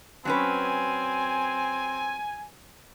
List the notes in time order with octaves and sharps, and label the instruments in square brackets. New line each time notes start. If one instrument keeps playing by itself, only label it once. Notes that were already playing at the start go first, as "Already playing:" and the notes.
[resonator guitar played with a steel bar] F#3 C#4 B4 [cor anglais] C4 [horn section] G#5